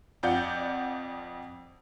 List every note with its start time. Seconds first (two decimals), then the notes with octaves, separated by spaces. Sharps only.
0.23 F2 F4 D5 F#5 G6